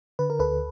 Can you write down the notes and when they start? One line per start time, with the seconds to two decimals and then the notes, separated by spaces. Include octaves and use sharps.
0.19 D3 B4
0.30 A#4
0.39 D2 A4 B4